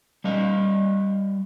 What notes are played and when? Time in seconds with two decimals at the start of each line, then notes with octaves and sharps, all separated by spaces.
0.24 G3 D#5 F5